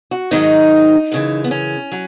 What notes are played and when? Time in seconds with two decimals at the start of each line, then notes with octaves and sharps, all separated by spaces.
0.11 F#4
0.31 G#2 D#3 F#3 D#4
1.12 F#2 C#3 E3
1.44 B3
1.51 C#4
1.92 F#3